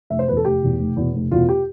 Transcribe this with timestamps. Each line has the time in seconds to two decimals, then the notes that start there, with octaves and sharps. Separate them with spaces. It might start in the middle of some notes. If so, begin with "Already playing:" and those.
0.10 F1 E5
0.19 C5
0.28 B2 B4
0.31 E2
0.37 A4
0.45 F1 G4
0.63 E2 B2
0.79 F1
0.96 E2 B2
1.14 F1
1.31 E2 B2 F4
1.49 G4